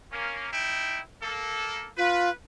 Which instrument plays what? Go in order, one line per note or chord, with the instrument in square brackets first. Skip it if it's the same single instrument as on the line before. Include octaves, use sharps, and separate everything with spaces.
[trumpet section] A#3 C#4
D#4 E4 G5
A#3 A4
[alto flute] F4 [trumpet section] B4